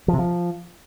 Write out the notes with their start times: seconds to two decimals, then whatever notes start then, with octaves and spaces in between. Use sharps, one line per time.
0.08 F3
0.13 C3
0.18 F3